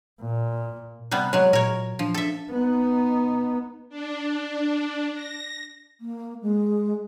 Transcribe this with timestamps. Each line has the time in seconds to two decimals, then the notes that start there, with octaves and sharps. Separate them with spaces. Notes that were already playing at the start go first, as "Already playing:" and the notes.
0.21 A#2
1.11 C3 G3 B3 F#6
1.33 F#3 G#3 C#5
1.53 A#2 A#4 C#5
1.99 F3 D4
2.14 A4 E5
2.51 B3 D#4
3.89 D4
5.14 A#6
6.01 A#3
6.42 G#3